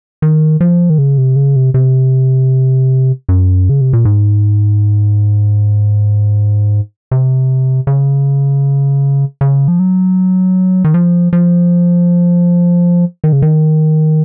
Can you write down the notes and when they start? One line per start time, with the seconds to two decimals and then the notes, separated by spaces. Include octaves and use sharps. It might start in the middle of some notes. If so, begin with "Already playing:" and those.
0.22 D#3
0.61 F3
0.90 D#3
0.98 C#3
1.18 C3
1.36 C#3
1.56 C3
1.74 C3
3.29 F#2
3.69 C#3
3.81 C3
3.93 A#2
4.05 G#2
7.11 C3
7.87 C#3
9.41 C#3
9.68 F3
9.79 F#3
10.84 D#3
10.94 F3
11.33 F3
13.24 D#3
13.33 C#3
13.42 D#3